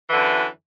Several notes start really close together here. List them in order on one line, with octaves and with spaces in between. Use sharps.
E3 D3 F#2